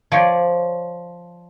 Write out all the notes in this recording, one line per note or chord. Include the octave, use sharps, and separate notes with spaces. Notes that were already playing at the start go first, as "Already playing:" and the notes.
F3 C#5 D5